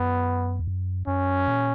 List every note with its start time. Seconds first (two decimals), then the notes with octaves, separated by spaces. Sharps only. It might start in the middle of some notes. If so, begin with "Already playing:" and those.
Already playing: F#2 B3
0.59 E2
0.67 F#2
1.07 F#2 C#4
1.48 A#2